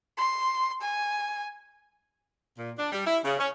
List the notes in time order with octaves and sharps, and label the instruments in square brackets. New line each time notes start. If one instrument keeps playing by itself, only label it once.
[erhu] C6
G#5
[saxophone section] A#2
D4
G3
E4
C#3
C#4